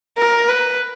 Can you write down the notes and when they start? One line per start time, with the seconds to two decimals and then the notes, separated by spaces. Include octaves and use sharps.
0.18 A#4
0.49 B4